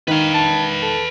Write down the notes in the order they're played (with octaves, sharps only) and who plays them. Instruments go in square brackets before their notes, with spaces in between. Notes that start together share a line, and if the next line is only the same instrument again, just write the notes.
[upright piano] D#3 [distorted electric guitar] B4 F5
[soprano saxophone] A5
A4